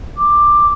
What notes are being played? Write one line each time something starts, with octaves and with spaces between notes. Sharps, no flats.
D6